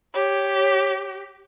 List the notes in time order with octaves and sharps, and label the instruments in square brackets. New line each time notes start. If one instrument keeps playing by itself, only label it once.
[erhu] G4 [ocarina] C#5